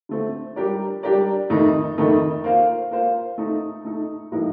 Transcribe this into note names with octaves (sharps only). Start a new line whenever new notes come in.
D3 A3 C4
G3 D4 G4 A#4 D5
G3 D4 G4 A#4 D5
F2 D#3 A3 D#4
F2 D#3 A3 D#4
A#3 F4 C5 F5
A#3 F4 C5 F5
A3 D#4 A4
A3 D#4 A4
A2 F3 A#3 D#4 A#4